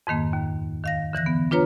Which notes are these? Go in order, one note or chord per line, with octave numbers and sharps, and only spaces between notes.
F2 G#2 D#3 A#3
D#2
D#3 F5 A#6
D3 E3 F#6 A#6
B3
D4 F4 B4 C#5 A#5